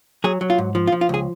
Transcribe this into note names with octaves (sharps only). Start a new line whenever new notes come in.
F#3 G#4
F#3
F4
G#2
F3
F4
F3
F4
C#2 G#4